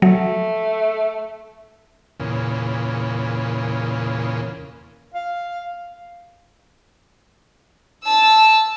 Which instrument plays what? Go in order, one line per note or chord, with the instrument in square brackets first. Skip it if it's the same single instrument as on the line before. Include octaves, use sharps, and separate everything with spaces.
[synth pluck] F#3 [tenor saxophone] A3
[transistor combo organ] E2 A#2 C#3
[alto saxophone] F5
[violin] A5 E6